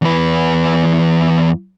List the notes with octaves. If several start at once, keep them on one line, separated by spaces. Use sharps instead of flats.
E2 B4